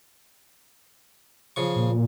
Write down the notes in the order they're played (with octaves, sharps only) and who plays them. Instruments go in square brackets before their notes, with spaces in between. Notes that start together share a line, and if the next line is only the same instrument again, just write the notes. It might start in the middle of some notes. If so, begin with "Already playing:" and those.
[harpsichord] C#3 F3 C#6
[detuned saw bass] A#2